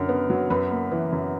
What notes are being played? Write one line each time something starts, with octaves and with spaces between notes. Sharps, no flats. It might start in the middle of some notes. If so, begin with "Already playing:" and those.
Already playing: F#2 D3 A#4
B3
F#3
F#2 B4 B5
A#3
E3
F#2